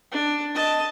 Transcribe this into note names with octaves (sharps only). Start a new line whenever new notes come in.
D4
D#5 A5